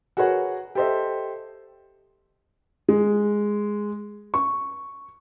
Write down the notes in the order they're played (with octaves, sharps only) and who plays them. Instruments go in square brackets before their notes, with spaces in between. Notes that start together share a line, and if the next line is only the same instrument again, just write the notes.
[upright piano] F#4 G#4 A#4 B4 C#5 F#5
G4 A4 C5 D#5 E5
G#3
C#6